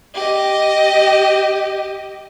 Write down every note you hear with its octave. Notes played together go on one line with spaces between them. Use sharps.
G4 D#5